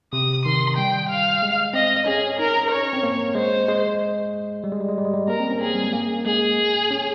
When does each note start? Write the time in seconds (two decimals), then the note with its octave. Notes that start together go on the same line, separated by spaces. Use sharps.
0.13 C3 D#6
0.45 D#3 C6
0.77 G3 G5
1.09 F5
1.42 G#3
1.73 C4 D#5
2.06 C#4 G#4
2.27 C#4
2.39 D#4 A#4
2.70 C#5
2.93 C4
3.03 A#3
3.35 G#3 C5
3.68 G#3
4.64 G3
4.72 G#3
4.81 G3
4.88 G#3
4.98 G3
5.05 G#3
5.14 G3
5.28 A#3 A#4
5.40 C4
5.50 C#4
5.61 C4 G#4
5.75 G3
5.84 G#3
5.93 A#3
6.25 G#3 G#4
6.91 C#4